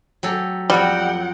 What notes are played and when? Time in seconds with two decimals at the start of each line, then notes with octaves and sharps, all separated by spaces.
0.23 F#3 G4 A4
0.70 F2 F#3 G3 F#5 G5